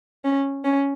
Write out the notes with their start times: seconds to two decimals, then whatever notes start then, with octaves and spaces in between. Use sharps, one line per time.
0.24 C#4
0.64 C#4